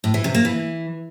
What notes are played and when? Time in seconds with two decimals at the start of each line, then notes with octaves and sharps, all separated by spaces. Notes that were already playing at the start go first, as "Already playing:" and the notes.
0.04 A2
0.14 E3
0.24 C3
0.34 A#3
0.45 E3